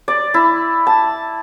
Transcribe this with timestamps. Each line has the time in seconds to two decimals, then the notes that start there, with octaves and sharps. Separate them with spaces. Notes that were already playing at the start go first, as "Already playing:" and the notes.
0.08 D5
0.34 E4
0.87 A5